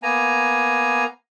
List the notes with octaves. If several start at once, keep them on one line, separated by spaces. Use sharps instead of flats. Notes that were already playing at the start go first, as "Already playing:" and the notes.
A#3 B3 G#5 A#5